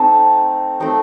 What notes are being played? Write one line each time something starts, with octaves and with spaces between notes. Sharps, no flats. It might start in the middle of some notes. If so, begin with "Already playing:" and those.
Already playing: A3 C4 D#4 A5
A3 C4 D#4 G5